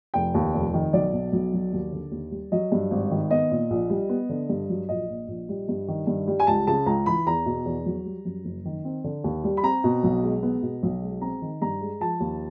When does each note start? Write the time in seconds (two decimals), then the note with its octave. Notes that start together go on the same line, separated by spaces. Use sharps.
0.14 F1 G5
0.34 D#2
0.54 F1
0.74 D#3
0.93 B1 D5
1.12 B2
1.33 B1
1.53 F#3
1.73 D#2
1.93 D3
2.11 D#2
2.31 G3
2.52 F#3 D#5
2.72 G2
2.91 G#1
3.11 D#3
3.30 B3 D#5
3.50 A#2
3.70 A#1
3.90 G3
4.09 B3
4.29 D3
4.49 G2
4.70 F#3
4.89 A#1 D#5
5.08 A#2
5.28 A#1
5.49 G3
5.69 G2
5.88 D#3
6.07 G2
6.28 G3
6.40 G#5
6.47 C#2 A5
6.67 C#3 A5
6.86 C#2 A#5
7.06 E3 B5
7.26 E2 A#5
7.46 B2
7.65 E2
7.86 F#3
8.05 G3
8.25 F#2
8.45 F#1
8.65 D#3
8.85 C4
9.04 D3
9.24 D#2
9.44 G3
9.57 B5
9.63 C4 A#5
9.84 B2
10.03 B1
10.23 G#3
10.43 B3
10.62 B2
10.83 B1
11.02 G#3
11.21 C4 A#5
11.42 D#3
11.62 G2 A#5
11.81 G#3
12.01 F3 A5
12.20 D#2